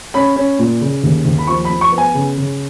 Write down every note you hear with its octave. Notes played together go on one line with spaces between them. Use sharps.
C#4 B5
C#4
A#2
C#3
D#2
D#2
B5
F3 C#6
B5
F3
C#6
B3
G#5
C#3
C#3